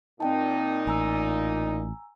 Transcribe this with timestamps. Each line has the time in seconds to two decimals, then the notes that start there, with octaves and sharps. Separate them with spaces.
0.20 A#2 C4 D#4 G5 A5
0.87 A1 G#5 A#5 E6